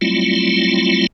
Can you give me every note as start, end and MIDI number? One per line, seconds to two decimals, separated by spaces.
0.01 1.07 54
0.01 1.07 55
0.01 1.07 57
0.01 1.07 60
0.01 1.07 64
0.01 1.07 65